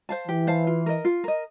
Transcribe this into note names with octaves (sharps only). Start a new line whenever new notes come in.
C5 F5 A5
E3 G4
C5 F5 A5
F4
A#4 D#5
F4
A#4 D#5